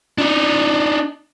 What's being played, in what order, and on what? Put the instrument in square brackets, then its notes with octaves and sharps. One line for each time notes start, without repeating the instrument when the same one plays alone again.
[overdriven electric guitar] D4 D#4